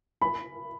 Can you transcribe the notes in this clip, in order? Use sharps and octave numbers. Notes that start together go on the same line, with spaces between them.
B5